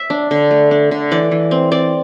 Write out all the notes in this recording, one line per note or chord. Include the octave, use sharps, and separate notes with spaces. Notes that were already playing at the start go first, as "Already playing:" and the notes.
Already playing: E5
D4
D3
A3
D4
D3
E3 D5
E3
C4
C4 D5